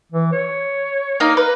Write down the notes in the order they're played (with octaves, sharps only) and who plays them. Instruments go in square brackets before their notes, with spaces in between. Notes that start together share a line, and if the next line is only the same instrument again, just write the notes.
[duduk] E3
C#5
[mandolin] A#3 D#4
B4